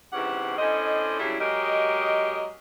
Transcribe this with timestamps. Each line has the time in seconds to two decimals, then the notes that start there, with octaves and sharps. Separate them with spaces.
0.12 G#2 C3 E3 C#4 G4 F#5
0.58 A2 C#4 D4 C5 D#5
1.19 C#3 F#3 G3 D4 E4
1.39 F#3 G#3 G4 A#4 D#5